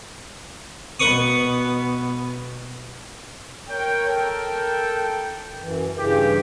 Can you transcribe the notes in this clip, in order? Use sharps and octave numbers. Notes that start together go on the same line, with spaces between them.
B2 B3 B4 C#6 D#6
A#4 C#5 G5
A4 G5
F#2 E3
G2 C#3 E3 G4